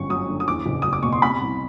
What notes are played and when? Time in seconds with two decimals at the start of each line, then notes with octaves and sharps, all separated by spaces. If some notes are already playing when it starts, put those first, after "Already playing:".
Already playing: G1 F#2 C#6
0.10 F#3 D#6
0.29 D3
0.40 D#6
0.48 E2 D6
0.66 F#1
0.82 F#3 D#6
0.93 D6
1.03 B2 C#6
1.13 C6
1.22 C3 B5
1.41 C2